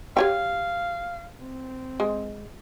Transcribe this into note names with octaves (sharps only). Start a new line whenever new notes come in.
G4 C#5 F5 G5
C4
G#3